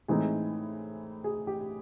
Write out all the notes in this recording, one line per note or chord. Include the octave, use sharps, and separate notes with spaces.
A2 E3 G#3 C4 D#4 G#4
G#4
G4